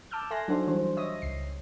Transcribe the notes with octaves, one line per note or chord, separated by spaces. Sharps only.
A5 D6 E6 F6 G6
A4 E5 G#5 C6 F#6 A#6
F#3 D4 D#4 F#4 A4 C5
E3 G3 D4 C5
C#5 D#5 E5 D#6 A#6
C#2 C7